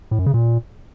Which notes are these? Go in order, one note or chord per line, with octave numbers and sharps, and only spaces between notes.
A2
F#2
C#3
A#2